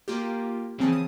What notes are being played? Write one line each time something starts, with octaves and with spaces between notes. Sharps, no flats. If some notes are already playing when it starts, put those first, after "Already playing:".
A#3 F4 G4
C#3 E3 F3 C4 G#4 A5
D#6